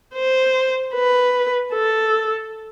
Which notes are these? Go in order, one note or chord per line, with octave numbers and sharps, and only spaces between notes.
C5
B4
A4